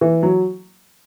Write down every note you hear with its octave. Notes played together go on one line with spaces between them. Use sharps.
E3
F#3